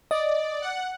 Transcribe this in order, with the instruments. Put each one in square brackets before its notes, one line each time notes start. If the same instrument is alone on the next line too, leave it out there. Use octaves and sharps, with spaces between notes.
[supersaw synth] D5 [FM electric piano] D#5
[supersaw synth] F#5